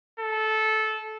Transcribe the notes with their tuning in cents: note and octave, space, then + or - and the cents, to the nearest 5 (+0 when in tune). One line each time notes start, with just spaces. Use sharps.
A4 -15